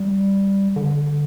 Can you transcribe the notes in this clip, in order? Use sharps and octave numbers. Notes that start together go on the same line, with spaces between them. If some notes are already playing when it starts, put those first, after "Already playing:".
Already playing: G3
D3